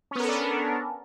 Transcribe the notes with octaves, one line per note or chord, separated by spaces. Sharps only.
B3 C#4 D4 A4 A#4